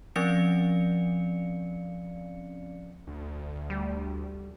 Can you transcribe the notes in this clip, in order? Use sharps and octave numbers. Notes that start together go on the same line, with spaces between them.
F3 C4 C#4 D5 F5 C#7
D2
G3